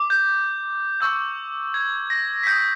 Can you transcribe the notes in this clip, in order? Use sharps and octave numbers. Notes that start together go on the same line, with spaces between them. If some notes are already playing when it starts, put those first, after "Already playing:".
Already playing: D6
G6
C#6 E6 G6
G#6
A#6
B6
D#6 G6 A#6